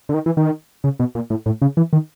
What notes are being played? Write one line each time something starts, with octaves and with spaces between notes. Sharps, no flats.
D3
D#3
E3
D#3
C#3
B2
A#2
A2
A2
C#3
E3
D#3